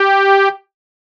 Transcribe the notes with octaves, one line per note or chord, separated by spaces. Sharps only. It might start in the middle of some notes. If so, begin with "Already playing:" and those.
Already playing: G4